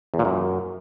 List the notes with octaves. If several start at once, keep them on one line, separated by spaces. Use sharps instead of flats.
E2
A#2
F#2